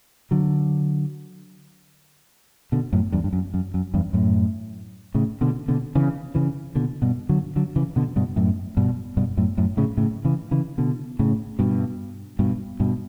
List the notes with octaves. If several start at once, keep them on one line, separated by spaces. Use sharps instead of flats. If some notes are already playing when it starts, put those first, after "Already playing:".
D3 F#3
B2 D3
F#2 A2
E2 G2
G2
F#2
F#2
F#2
E2 G2
F#2 A2
A2 C#3
B2 D3
B2 D3
C#3 E3
C#3 E3
B2 D3
G2 B2
D3 F#3
D3 F#3
C#3 E3
B2 D3
G2 B2
F#2 A2
G2 B2
G2 B2
F#2 A2
F#2 A2
A2 C#3
A2 C#3
C#3 E3
C#3 E3
B2 D3
A2 C#3
G2 B2
G2 B2
G2 B2